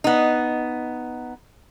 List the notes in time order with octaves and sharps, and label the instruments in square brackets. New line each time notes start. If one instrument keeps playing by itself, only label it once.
[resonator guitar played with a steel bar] B3 D#4